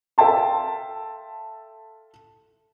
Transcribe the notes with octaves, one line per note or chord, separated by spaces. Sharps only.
A4 E5 F5 G5 A5 C6